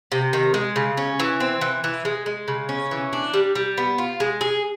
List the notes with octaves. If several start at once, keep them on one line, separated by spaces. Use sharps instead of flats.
C3
D#3
G#3
C#3
C#4
E3
C4
E3
E3
G#3
G#3
C#3
C#4
E3
D4
G3
G3
B3
F4
G#3
G#4